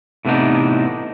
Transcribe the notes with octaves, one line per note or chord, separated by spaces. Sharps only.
A2 C3 E3 B3 D4 D#4